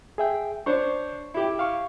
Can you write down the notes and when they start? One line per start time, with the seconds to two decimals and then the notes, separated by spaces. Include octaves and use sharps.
0.18 G#4 E5 G5
0.66 D4 C5 C#5 C#6
1.34 E4 G4
1.59 F5 C#6